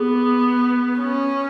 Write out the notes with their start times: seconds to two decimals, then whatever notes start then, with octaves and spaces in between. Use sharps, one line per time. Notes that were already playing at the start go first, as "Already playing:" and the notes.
Already playing: B3 G#4
0.99 C#4